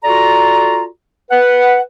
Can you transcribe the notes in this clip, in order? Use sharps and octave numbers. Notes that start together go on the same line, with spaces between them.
F4 F#4 A4 D5 A#5
B4 F#5